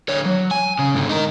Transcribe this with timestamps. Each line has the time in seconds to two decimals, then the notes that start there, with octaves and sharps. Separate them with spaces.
0.09 D3 C#5
0.25 F#3
0.51 G#5
0.79 C#3
0.95 G#2 D3
1.09 D#4 A#4